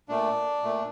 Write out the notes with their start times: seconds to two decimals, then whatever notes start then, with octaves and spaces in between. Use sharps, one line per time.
0.09 A#2 A3 D4
0.63 A#2 A3